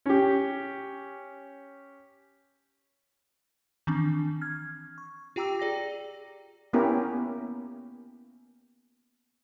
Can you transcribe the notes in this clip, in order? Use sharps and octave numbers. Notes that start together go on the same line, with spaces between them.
C#4 G4
D#3 E3 C4 D4
F6 G#6
C#6
F4 G4 G5 A#5 D6 E6
G#4 D5 G5 A#6
A#3 B3 C#4 E4 G4 A#4